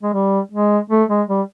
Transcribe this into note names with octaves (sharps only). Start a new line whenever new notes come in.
G#3
G3
G#3
A3
G#3
G3